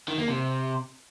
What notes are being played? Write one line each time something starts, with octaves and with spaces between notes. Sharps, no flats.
D#3
A#3
C3